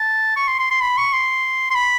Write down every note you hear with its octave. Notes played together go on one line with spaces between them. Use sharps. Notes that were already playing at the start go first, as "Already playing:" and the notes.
Already playing: A5
C#6
C6
C6
C6
B5
C#6
C6
C6
B5